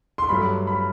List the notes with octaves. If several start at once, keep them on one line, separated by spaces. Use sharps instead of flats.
C6
G2 F#3 A3 B5
B5